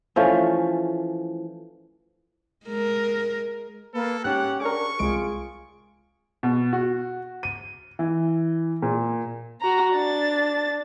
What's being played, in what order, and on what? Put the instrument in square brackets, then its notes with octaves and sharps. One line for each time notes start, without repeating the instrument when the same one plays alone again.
[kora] E3 F3 A3 C#4
[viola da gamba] G#3 A#4
[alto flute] A#3 [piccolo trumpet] A4 [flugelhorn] B4
[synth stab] G#2 F#6 [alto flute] C#4 [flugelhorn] G4 [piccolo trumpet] F#5
[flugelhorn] D4 [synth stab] G#4 A#4 [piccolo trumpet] C#6
[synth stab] C2 G#3 D7 [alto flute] F4 [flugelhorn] G#4
[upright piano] B2
F#4
D#7
E3
A#2
[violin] F#4 A#5
D4 A6